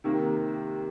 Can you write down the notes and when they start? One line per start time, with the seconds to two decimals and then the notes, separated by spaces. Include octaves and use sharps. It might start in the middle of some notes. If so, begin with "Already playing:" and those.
0.04 C3 D#3 A#3